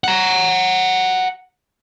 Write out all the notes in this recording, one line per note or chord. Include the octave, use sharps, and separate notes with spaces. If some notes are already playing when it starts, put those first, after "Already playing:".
F#5 A#5